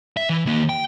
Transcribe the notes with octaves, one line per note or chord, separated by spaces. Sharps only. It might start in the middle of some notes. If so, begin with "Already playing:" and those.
E5
E3
D#3 A#3
G5